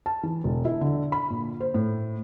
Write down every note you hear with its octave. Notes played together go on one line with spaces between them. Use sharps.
A5
E3
E1
E4
D3
B5
A#2
C5
A2